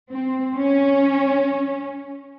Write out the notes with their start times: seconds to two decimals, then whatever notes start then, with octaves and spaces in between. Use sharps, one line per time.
0.10 C4
0.55 C#4